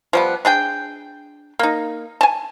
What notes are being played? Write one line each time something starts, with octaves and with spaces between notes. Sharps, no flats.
F3 G3 B3
D4 G#4 G5
A#3 D#4
G#5 A5